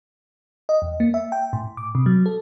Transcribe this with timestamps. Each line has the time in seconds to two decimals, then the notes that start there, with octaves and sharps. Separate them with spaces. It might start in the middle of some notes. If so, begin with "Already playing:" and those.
0.69 D#5
0.82 E2
1.00 A#3
1.14 E5
1.32 G5
1.53 A2
1.77 D6
1.95 C3
2.06 F#3
2.26 A4